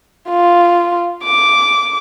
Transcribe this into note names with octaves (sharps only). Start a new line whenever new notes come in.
F4
D6